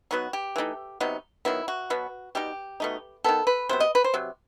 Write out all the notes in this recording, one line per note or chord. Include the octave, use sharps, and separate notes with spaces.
F#3 B3 D#4 F#4
G4
E3 A3 D#4
C3 F#3 B3 D#4
D#3 F#3 B3 E4
F#4
B2 F#3 B3
B2 G3 D#4 G4
B2 A3 D#4
D#3 F#3 B3 A4
B4
C3 F#3 B3 C5
D#5
B4
C5
C3 F#3